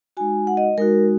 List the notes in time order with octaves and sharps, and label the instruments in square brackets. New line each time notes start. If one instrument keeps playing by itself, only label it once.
[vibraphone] G#3 D#4 F#4 G#5
F#5
D#5
G#3 D#4 F#4 A#4